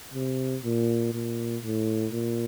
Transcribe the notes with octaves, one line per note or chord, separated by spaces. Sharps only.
C3
A#2
A#2
A2
A#2